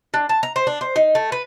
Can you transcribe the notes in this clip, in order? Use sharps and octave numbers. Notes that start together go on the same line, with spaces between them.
D4
A5
A#5
C5
D4
C5
D#4
A3
B4